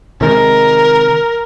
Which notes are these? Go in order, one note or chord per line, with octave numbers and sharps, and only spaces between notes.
C3 D#3 G#3 A#4